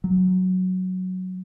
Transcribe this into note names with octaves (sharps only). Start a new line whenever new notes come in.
F#3